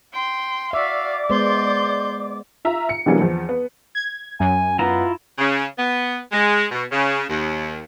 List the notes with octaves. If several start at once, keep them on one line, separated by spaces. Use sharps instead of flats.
G5 C6
F#4 D5 E5 F5 D6
G#3 B3 C5 C6 G6
F4 E5 A#5
C#7
B2 D3 E3 F#3 G3 A#3
E2 F3
B3
G#6
F#2 G#5
B3 E4 F4 A#5
C#3
B3
G#3
B2
C#3
D#2